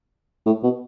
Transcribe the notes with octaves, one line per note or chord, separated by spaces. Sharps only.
A2
B2